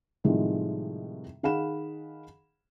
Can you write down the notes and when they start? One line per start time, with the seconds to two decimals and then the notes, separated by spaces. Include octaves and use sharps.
0.24 A2 C3 D#3 F3 G3 G#3
1.43 D#3 G#4 F5 F#5 B5 E7